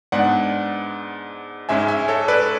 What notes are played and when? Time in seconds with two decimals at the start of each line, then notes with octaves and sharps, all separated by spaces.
0.12 G#2 G#3 B3 D4 D5 F#5
1.69 G#2 G#3 C#4 E5 G#5
1.88 E5 G#5
2.08 A4 C#5
2.28 B4 D5